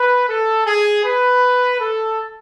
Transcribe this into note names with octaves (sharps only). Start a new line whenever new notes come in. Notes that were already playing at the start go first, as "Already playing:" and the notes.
Already playing: B4
A4
G#4
B4
A4